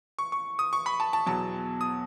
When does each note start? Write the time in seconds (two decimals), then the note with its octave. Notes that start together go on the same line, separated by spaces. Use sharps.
0.19 C#6
0.32 C#6
0.59 D#6
0.73 C#6
0.86 B5
1.00 A5
1.13 A5
1.26 E2 B2 F#3 A5
1.81 D#6